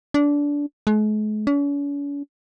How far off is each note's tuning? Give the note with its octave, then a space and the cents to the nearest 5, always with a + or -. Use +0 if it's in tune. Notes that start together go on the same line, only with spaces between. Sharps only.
D4 -20
G#3 +45
C#4 +45